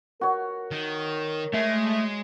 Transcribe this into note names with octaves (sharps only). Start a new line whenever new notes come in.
F#4 A#4 C#5
D#3
G#3 A3 E5